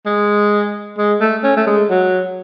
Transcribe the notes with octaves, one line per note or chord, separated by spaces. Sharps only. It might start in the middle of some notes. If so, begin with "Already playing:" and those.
G#3
G#3
A3
C#4
A3
G#3
F#3